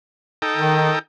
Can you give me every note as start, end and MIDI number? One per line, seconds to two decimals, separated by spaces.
0.42 0.99 63
0.42 0.99 69
0.42 0.99 79
0.57 0.91 51